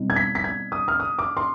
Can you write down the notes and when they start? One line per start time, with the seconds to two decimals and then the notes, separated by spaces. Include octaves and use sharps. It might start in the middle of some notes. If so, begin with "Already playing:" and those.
Already playing: B2 G3 C4 D#4
0.10 G#6
0.16 B6
0.35 B6
0.44 G#6
0.72 D#6
0.88 F6
1.00 D#6
1.19 D6
1.37 C6